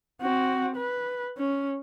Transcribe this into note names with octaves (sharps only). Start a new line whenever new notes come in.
C4 F#4
B4
C#4